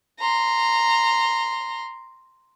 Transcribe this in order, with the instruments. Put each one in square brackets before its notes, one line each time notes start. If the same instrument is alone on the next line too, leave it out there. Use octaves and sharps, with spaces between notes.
[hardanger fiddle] A#5 C6